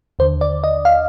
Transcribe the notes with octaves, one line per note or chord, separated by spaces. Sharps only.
D#2 D3 C5
D5
D#5
F5